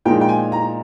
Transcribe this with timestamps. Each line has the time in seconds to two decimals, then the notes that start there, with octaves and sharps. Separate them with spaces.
0.05 A#2 F3 G#3 D#4 G5
0.21 G5
0.29 G#5
0.52 A#5